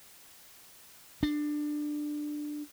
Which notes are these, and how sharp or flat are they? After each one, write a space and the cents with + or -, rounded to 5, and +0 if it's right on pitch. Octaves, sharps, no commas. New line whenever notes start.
D4 +15